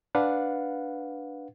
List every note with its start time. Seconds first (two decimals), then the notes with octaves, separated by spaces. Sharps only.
0.15 D4 B4 F5 F#5